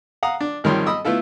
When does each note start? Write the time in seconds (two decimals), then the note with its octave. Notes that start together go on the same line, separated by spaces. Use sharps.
0.23 F5 F#5 A#5 D#6
0.41 D4
0.64 G#1 D#3 F3 G3 C#5 C6
0.86 D#5 B5 D#6 E6
1.05 A3 B3 E4 F4 A4